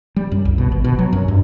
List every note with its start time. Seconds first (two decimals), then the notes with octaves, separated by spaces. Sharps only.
0.16 G3
0.32 F#2
0.45 C2
0.58 B2
0.72 G#1
0.84 B2
0.99 F#3
1.13 F#2
1.28 G2